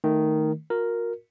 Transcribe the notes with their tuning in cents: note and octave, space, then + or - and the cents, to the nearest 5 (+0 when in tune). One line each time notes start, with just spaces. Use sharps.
D#3 +0 A3 +10
F#4 -45 A#4 +0